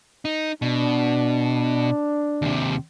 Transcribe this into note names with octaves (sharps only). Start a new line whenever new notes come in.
D#4
B2 D4
D#2 C3